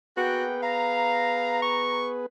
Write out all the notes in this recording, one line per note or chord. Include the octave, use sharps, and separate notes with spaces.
A#3 B3 F#4 G#4 B4 F#5 G5
F5 A#5
C#6